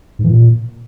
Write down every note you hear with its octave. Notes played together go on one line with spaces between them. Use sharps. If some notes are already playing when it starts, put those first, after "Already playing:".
G#2
E3
A#2